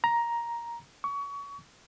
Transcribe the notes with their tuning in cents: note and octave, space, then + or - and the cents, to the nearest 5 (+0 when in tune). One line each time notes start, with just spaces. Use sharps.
A#5 +10
C#6 +30